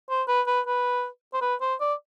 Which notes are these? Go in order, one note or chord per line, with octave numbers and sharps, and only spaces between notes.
C5
B4
B4
B4
C5
B4
C5
D5